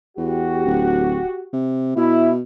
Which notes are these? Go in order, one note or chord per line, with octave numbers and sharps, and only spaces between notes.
E2 F#4 G4
D1
C3
B2 E4